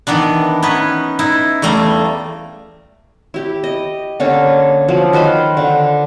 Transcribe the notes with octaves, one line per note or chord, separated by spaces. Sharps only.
D#3 E3 B3 D4
B3 C#4 D#4 B4
D#4 E4
E2 G3 A3 F5 A#5
E4 G4
D#5
D3 A#3 C#4 A4
F3 F#3
D#3 B4 C5 F5
D3